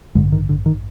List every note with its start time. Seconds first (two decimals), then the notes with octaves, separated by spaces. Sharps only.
0.15 A1 G2 D3 G#3
0.32 D#3
0.49 D3
0.66 D#3